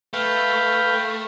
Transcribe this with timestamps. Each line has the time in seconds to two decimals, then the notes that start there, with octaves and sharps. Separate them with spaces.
0.13 A3 B4 F5 G5